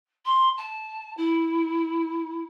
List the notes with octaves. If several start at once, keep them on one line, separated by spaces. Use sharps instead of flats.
C6
A5
E4